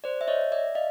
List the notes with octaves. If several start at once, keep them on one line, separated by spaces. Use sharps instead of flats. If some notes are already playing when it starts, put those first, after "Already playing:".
C5 D5
E5
C#5 D#5
D5 E5
D#5 F5